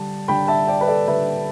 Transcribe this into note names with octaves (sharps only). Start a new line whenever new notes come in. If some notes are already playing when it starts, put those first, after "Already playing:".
Already playing: D3 G3 D4 A5
D3 G3 D4 G5 B5
E5 A5
D5 G5
B4
A4 D5
D3 G3 D4 B4 E5